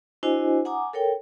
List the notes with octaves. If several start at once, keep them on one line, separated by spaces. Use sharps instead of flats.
D4 E4 F#4 C5 D#5 G#5
F#5 G#5 A#5 D6 D#6
A4 A#4 C#5 G5